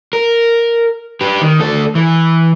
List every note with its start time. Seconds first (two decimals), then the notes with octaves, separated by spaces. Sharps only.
0.13 A#4
1.21 G4 B4
1.41 D#3
1.59 D2 A4
1.95 E3